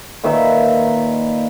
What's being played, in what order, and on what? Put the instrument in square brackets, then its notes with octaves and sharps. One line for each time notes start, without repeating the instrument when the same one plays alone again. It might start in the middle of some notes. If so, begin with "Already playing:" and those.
[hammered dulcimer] A#2 D#3 B4 E5